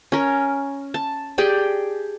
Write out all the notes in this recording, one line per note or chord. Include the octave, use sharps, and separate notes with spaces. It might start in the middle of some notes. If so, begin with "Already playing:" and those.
C#4 A#4
A5
G4 G#4 D5 G5